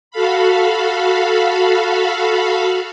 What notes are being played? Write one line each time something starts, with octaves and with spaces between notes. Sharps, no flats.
F#4 A4 F5 B5